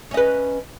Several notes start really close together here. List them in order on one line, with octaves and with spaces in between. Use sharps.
C#4 D#5 B4